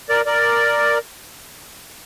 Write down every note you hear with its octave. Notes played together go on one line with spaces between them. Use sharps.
A#4 D5
A#4 D5